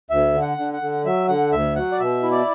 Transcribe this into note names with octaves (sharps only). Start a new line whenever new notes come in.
D2 E5
D3
F#5
D3
F#5
D3
F#3 E5
D3 F#5
D2 E5
F#3 F#5
D5
B2 E5
E4
D5